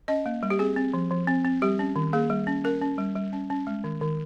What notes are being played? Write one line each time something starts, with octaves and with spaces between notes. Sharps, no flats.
C#4 D#5
A#3
G3
G4
C4 G#4
C4
F3
F3
C4
C4
G3 G4
C#4
D#3
A#3 G#4
G3
C#4
C#4 A#4
C#4
G3
G3
C#4
C#4
G#3
D#3
D#3